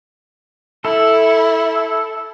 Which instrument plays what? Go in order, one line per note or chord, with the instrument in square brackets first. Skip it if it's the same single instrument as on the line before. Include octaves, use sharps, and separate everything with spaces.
[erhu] E4 [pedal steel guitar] A4